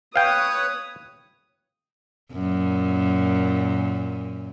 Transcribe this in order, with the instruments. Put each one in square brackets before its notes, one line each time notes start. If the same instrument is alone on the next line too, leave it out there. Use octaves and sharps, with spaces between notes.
[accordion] B4 C#5 [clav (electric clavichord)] F5 G5 [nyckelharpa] D#6
[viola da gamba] F#2 A#2